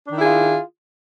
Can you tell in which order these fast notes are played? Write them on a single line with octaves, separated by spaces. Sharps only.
D4 D#3 E4 G#4 F4